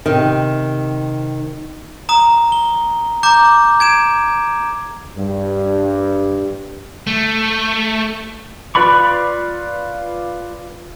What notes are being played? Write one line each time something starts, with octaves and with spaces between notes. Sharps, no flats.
C3 D#3
A#5 D#6
G7
A#5 D6 G6
G#6 D7 E7
G2
A3
F4 B4 D5 B5 C#6